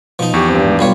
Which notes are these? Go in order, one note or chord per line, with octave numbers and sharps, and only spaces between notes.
B2 F3 D#4
E2 G4 C#6
G2 C4
G#2
B1 G3 F4 C#5